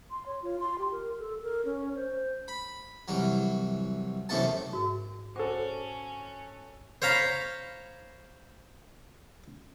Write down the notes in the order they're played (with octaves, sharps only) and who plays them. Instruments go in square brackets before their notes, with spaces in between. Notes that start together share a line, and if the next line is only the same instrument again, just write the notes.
[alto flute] C6
C#5
F4
C6
G4
A#4
A4
A#4
C#4
C5
[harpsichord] B5
C2 E3 F#3
F#2 C3 E3 A3 B3 A5
[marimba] G#2 [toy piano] F#4 A#4
[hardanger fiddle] C#4 [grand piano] F#4 A4 [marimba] C5 [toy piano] D6
[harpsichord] C5 C#5 F5 A#5 B5